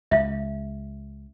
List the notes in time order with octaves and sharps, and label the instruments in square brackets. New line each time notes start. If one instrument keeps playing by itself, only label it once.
[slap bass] C#2 [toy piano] E5 F5